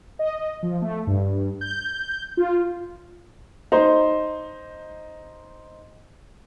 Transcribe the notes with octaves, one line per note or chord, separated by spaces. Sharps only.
D#5
F3
A3
G2
G6
F4
D#4 C5